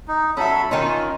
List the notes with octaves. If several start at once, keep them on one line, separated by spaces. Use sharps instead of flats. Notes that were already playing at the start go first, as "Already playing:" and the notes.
D#4
F#3 C#4 A4 E5 B5
D#3 C#4 D#4 F4